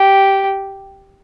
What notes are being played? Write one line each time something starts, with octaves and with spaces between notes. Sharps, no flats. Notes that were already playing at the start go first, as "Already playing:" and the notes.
Already playing: G4